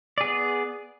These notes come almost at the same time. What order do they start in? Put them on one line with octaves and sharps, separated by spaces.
D5 G#4 B3